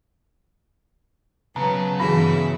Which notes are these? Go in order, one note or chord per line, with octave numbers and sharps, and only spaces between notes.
C#3 F#3 B3 A5 A#5
G2 E3 B3 F#4 G#4 E5